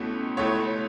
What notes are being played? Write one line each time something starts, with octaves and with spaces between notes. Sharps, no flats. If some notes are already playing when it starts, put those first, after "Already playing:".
Already playing: C#2 B2 A3 C#4 E4
C#2 B2 A3 E4 C#5